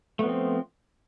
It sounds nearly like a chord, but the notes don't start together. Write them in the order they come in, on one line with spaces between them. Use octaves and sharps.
A3 B3 F3 C4